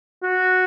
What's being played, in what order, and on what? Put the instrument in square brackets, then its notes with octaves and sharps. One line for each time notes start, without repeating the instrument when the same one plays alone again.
[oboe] F#4